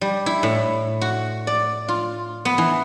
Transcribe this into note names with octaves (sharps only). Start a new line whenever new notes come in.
G3
E4
A2
F#4
D5
F4
B3
E3